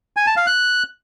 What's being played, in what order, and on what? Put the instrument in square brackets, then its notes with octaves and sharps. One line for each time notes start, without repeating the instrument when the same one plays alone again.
[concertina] G#5
A5
F5
F#6